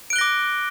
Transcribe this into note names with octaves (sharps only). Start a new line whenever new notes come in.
D6 F#6 A#6 D7 G7